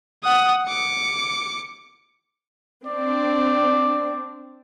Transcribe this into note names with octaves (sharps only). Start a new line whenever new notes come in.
F#5 D#6
D6 C#7
C4 D4 D5